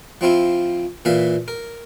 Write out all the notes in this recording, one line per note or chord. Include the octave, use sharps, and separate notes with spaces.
F3 C4 E4 F4
A#2 E3 E5 F5
A#4